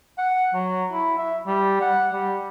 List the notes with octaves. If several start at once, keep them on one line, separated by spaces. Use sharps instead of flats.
F#5
F#3
E4
E5
G3
F#5
G3